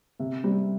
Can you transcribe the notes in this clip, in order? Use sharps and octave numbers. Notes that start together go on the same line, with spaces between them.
C3
G3 C4